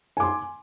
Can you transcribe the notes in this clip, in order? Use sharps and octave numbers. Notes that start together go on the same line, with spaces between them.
G#5 C6 D6